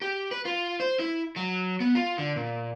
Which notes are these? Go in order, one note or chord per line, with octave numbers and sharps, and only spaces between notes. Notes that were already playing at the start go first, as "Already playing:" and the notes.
G4
B4
F4
C5
E4
F#3
B3
F4
D3
A#2